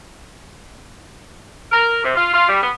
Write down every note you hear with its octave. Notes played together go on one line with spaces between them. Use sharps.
A#4
C3
F4
F4
G3
B3